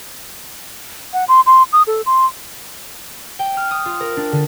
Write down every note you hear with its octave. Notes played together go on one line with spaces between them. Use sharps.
F#5
C6
C6
D#6
A4
C6
G5
F6
D#6
F4
A#4
D4
D3